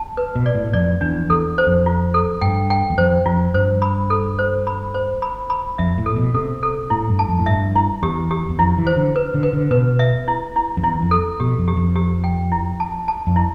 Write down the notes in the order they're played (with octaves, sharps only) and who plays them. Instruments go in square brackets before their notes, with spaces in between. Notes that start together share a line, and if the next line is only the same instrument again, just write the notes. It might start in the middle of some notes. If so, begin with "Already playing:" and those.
Already playing: [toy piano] A5
B4
[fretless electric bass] B2
[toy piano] D5
[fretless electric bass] A2
[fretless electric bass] F2 [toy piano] D5
[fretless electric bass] E2 [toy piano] D4
[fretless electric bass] E2 [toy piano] A4
[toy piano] C5
[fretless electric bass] F2
[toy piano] F4
A4
[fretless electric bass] G2 [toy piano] G5
[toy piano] G5
[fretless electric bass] E2
[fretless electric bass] F2 [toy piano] C5
[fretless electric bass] F2 [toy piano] F4
[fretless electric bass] G2 [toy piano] C5
[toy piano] B5
A4
C5
B5
C5
B5
B5
[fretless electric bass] F2 [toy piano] E5
[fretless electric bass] A2
[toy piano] A4
[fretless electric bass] B2
[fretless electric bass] C3 [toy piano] A4
[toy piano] A4
[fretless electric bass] A2 [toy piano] E4
[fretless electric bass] G2
[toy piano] A5
[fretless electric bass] F2
A2
[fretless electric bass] G2 [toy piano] E5
[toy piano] E4
[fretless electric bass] E2 [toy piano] G4
[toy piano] G4
[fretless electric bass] E2
[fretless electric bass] F2 [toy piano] E4
[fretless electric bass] E3
[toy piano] C5
[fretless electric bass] D3
[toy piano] B4
[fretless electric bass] D3
[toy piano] B4
[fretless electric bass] D3
[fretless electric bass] B2 [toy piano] B4
[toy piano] E5
E4
E4
[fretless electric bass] F2
[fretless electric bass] E2 [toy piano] E4
[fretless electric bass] F2
[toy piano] A4
[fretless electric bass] B2 [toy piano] G4
[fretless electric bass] F2
[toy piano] G4
[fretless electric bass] F2
[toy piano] G4
G5
E4
A5
A5
[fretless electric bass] F2
[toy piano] E4